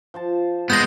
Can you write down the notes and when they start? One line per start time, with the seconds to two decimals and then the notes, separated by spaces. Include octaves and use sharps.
0.14 F3 C5 A5
0.70 G#3 B3 G6 A#6